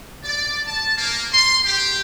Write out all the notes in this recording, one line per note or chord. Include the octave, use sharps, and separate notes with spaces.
D5
A5
A#3
C6
G4